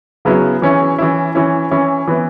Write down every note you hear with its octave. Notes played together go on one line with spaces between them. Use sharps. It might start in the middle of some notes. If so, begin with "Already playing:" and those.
C#3 F#3 B3 E4
E3 C#4 E4
E3 C#4 E4
E3 C#4 E4
E3 C#4 E4
E3 B3 E4